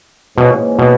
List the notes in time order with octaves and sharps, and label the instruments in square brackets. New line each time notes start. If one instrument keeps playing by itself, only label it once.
[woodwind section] G#2 E3 A#3 C#4 [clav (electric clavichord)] B2
[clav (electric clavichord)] B2